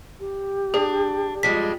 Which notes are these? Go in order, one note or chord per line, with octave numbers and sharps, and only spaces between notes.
G4
D4 G#4
F2 G3 G#3 B6